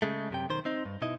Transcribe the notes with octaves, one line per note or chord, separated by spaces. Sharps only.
C#3 G#3 A3
F#2 C3 G5
B1 D#3 C5
C4 D#4
G2
B2 D#4 E4 D#5